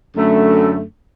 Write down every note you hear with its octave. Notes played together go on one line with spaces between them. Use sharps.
F#2 D3 A3